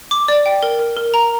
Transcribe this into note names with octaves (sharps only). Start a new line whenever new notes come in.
D6
D5
G5
A#4
A#4
A#4
A#5